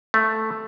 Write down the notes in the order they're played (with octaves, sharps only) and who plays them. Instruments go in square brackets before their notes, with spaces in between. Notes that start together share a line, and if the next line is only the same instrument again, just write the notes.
[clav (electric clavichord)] A3